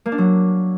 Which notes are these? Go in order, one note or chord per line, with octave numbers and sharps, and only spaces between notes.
A#3
D4
F#3